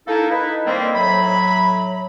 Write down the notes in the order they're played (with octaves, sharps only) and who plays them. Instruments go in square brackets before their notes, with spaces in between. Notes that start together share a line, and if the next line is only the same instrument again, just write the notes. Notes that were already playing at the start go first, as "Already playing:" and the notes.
[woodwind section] A#3 D#4 E4 A4
D#4 E4 B4
D#3 G3 A#3 C4
A2 F#3 B5